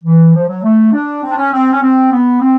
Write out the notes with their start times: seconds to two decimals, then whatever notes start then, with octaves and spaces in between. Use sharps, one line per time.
0.04 E3
0.34 F3
0.48 F#3
0.63 A3
0.93 D4
1.22 C4
1.31 D4
1.37 C#4
1.52 C4
1.73 C#4
1.82 C4
2.12 B3
2.41 C4